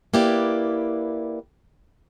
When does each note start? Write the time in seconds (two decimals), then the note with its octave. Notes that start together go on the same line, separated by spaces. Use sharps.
0.14 A#3 E4 G4 B4 D5